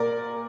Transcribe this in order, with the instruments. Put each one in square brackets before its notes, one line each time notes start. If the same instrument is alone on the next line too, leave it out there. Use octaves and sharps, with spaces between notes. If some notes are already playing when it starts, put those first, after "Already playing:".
Already playing: [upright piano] A#2 A#4 D5